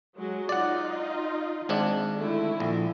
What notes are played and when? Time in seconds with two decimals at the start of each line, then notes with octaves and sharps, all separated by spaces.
0.17 F#3 G#3 F#4
0.49 D#4 F4 D5 F#5
1.69 G#1 G#2 D4
2.17 D3 A3 E4
2.60 A#1